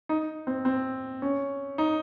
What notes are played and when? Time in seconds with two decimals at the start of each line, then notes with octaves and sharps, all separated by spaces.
0.09 D#4
0.47 C4
0.65 C4
1.22 C#4
1.78 D#4